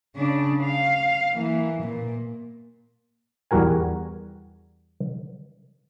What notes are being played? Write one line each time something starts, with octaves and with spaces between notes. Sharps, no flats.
C#3 D4
F5
E3 A#3
A#2
E2 G3 F#4 A#4 G#5